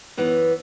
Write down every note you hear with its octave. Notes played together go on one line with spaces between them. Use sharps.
F#2 E3 B3